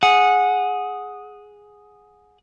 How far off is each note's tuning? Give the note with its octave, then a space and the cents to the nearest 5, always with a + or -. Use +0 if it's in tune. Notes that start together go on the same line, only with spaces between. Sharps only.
G#4 +0 F#5 -15